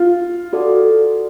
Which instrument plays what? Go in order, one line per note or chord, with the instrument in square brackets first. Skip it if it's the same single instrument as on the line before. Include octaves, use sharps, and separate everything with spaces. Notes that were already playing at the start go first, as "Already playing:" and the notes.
Already playing: [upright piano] F4
[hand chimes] F#4 A4 D5